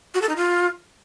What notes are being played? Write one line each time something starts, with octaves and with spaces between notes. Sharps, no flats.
F#4
A4
D#4
F4